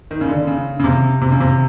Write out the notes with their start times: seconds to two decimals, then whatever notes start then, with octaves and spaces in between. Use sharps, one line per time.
0.11 D#3
0.21 C#3
0.29 D3
0.47 C#3
0.79 C#3
0.84 C3
1.21 C3
1.32 C#3
1.40 C3